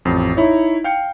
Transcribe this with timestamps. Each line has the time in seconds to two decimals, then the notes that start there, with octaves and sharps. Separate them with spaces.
0.05 A1 F2
0.37 D#4 E4 C#5
0.84 F5 G5 G6 C#7